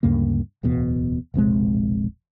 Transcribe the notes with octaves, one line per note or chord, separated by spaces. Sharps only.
D2 G2 C#3 A#3
D1 E2 B2 B3
E1 A#1 C3 G#3